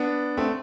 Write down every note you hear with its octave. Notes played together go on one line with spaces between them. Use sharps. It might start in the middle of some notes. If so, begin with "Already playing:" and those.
Already playing: B3 D4
A3 C4